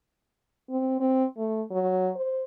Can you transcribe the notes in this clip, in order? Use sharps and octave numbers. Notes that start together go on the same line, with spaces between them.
C4
C4
A3
F#3
C5